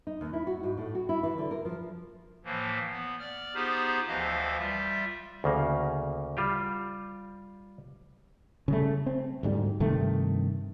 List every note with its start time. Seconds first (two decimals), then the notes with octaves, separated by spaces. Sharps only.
0.07 D#4
0.21 D#2
0.33 E4
0.47 F#4
0.63 G#2
0.78 A2
0.95 F#4
1.09 E4
1.23 E3
1.38 D3
1.51 A#4
1.65 F3
2.45 A2 E3 F3 A#3
2.90 B3
3.20 D5 F6
3.54 B3 D#4 F4 G4 G#4 C5
4.07 D2 E3 F3 D#5 F5
4.58 G3 F4 E5
5.44 D2 C#3 A#3
6.37 G3 F4 G4
8.68 C#3 G3 A3
9.06 C4
9.43 D2 G#2 G3
9.80 G2 C3 D#3 A3